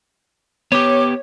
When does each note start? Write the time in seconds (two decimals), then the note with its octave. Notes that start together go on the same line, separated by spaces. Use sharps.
0.72 B3 G4 C#5 D6